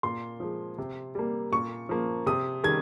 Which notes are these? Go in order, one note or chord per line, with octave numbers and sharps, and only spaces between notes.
A#2 C6
F3 G#3
C3
G3 A#3
A#2 C#6
F3 A#3
C3 D#6
D#3 G3 G#6